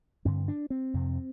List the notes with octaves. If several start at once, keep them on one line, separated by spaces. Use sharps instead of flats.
G2 D3 C4
D4
C4
F2 C3